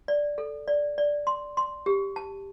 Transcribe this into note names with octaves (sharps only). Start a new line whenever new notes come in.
D5
A4
D5
D5
C6
C6
G4
A5